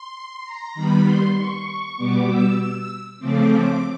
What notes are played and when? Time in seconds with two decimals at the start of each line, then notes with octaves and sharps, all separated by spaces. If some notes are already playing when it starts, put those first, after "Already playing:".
Already playing: C6
0.44 A#5
0.75 D#3 G3 B3 B5
1.05 C6
1.36 C#6
1.97 B2 G3 B3 D6
2.27 E6
3.19 C#3 F3 A3 C4 D6